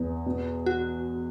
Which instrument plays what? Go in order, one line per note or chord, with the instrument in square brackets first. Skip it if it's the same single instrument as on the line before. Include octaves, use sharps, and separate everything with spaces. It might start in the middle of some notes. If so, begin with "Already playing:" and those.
Already playing: [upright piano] E2
B2
[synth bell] F#4